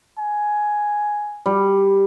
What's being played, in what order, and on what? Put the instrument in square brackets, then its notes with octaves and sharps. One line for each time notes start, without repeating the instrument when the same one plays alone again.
[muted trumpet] G#5
[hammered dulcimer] G3